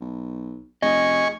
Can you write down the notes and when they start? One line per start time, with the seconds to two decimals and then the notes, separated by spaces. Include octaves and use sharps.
0.01 B1
0.82 F1 G#4 D#5 G#5 C#6